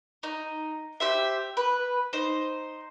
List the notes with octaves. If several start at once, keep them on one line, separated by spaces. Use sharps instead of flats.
D#4
G4 C5 E5
B4
D#4 C5